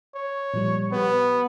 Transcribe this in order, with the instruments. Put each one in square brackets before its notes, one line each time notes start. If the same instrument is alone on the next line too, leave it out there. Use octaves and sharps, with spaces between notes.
[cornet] C#5
[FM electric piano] A#2 F3 G3
[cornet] B3 [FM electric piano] G4 B4